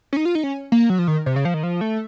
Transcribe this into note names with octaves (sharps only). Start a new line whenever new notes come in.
C#4
D#4
F4
D#4
C#4
A#3
F#3
F3
D#3
C3
C#3
F3
D#3
F3
A3